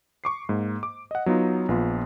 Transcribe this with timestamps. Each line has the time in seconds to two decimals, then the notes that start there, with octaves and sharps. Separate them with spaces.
0.24 C#6 D6 C7
0.49 G#2 A#3
0.83 D6
1.11 D#5 F#5
1.26 F#3 B3 D#4 F4
1.69 A#1 B3 F4 C6